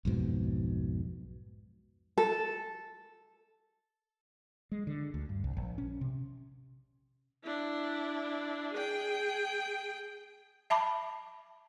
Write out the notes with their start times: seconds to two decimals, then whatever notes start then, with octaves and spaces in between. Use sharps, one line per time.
0.05 B1 F2 G#2 B2
2.18 A4
4.72 G#3
4.87 D3
5.14 D2
5.29 G2
5.44 C2
5.57 A#1
5.78 C#4
6.01 C3
7.44 D4 E4
8.73 G#4 G5
10.70 E5 A5 B5 D6